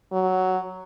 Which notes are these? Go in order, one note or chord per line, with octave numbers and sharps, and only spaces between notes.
F#3